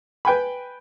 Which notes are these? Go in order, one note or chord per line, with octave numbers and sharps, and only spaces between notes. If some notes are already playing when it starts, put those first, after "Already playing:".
B4 G5 G#5 B5